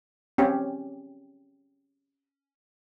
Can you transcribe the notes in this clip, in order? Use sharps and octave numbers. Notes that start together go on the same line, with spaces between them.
C4 C#4 G4